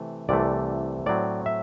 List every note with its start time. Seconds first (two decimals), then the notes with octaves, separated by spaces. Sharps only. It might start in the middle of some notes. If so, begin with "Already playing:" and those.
Already playing: C3 E3 A3
0.29 C2 C3 E3 A3 D5
1.06 A2 F#3 C4 D5
1.46 E5